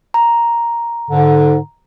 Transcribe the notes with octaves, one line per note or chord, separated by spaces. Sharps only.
A#5
G#2 D3